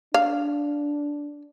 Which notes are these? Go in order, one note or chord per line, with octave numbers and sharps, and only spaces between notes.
D4 F5